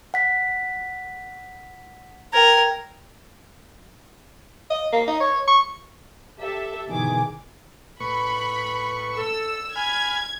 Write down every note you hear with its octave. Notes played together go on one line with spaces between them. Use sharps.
F#5 B6
A#4 G5 G#6
D#5
A#3
D#4
C#5
C#6
G4 A4 E5
G1 B2 D#3 E3 G#4 D6
A2 B4 B5 C#6
A4 E6
G#5 B5 F6 G#6